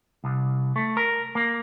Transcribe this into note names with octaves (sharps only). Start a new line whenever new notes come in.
C2
A3
A#4
A#3